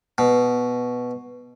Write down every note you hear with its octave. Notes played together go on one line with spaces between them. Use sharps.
B2